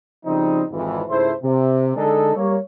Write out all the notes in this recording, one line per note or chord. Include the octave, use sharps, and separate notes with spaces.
C#3 F3 G3 C4 D#4
G#1 F2 G#2 E3
C#2 G#2 A3 E4 C5
C3
D3 G#3 D4 D#4 G#4 A4
G3 A#3 C#5